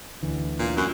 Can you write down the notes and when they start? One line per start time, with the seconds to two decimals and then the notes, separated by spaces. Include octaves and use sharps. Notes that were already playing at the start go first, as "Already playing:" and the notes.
0.23 D2 D3 E3
0.59 A#2
0.77 F#2